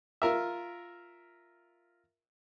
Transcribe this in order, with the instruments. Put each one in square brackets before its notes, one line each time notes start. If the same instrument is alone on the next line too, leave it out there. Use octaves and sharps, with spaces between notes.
[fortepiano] F4 A#4 E5